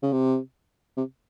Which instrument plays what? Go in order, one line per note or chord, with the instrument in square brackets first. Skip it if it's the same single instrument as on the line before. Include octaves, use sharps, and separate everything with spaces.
[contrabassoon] C#3
C3
C3